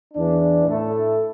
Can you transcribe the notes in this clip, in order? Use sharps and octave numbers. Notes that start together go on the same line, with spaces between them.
E2 E3 D4
A2 A3 E4 A4